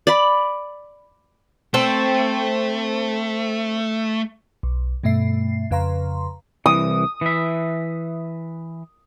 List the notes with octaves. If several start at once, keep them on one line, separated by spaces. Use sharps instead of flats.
D5 B5
A3 C4 A4
B1
G2 B2 A3 E5 C7
F2 C#3 B4 F5 A#5 C6
C2 E3 D#6
E3 E5